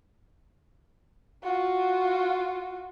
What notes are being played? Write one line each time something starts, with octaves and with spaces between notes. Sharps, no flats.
F4 F#4